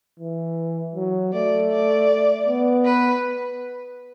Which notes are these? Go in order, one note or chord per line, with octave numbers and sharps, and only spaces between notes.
E3
F#3
A3 D5
D5
B3
B4